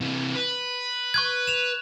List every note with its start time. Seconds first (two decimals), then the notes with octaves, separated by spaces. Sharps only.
0.01 C3 E3
0.35 B4
1.14 C#6 F#6 G#6
1.47 E7 F7